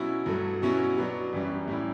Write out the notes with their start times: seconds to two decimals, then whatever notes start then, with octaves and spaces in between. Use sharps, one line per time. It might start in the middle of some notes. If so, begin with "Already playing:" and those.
Already playing: B2 F#3 C#4 E4
0.26 G2 F#3 A3
0.62 B2 F#3 C#4 E4
0.97 B2 F#3 B3 D4
1.33 F#2 E3 G3 C#4
1.68 A2 G3 C#4 E4